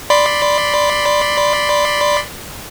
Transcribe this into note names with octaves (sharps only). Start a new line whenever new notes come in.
D5 B5 C6